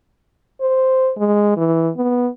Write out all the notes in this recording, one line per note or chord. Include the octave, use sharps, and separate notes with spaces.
C5
G#3
E3
B3